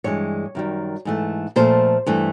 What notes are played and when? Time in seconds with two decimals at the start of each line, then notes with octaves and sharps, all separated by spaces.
0.04 G2 E3 G#3 C#5
0.55 F#2 D#3 G3
1.05 G#2 E3 A3
1.56 A#2 F3 A3 C5
2.06 G2 E3 A3